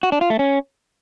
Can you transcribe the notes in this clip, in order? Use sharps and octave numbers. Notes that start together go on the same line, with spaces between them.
F#4
D4
F4
A3
C#4